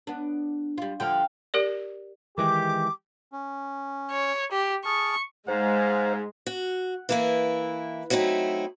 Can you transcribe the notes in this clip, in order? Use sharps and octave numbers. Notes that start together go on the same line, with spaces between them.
B3 D4
G3 F4
D3 F3 F5 G5
G4 A#4 D5
D#3 E3 G#3 G4 D6
C#4
C#5
G4
G#4 A5 C#6 F6
G#2 G#3 C5 F5
F#4
E3 A#3 E4
F#3 A3 C4 D#4 E4